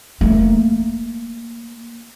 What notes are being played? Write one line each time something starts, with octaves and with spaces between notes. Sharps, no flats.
A3 A#3